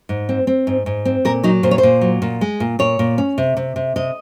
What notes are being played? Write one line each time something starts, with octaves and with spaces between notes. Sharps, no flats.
G#2
C4
C4
G#2
G#2
C4
A#2 A#4
F#3 D#4
A#2 C5
C#5
C5
A#2
F#3
A#2
G#3
A#2
A#2 C#5
A#2
C#4
C3
C3
C3
C3 D#5